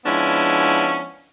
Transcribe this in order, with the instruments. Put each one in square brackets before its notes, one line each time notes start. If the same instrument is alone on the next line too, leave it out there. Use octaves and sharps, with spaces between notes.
[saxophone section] F3 G#3 B3 C#4 D4 E4